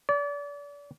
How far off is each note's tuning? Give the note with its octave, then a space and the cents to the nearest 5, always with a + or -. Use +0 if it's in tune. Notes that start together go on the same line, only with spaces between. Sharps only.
D5 -35